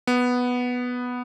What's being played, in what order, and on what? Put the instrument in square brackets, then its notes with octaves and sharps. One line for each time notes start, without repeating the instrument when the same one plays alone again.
[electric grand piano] B3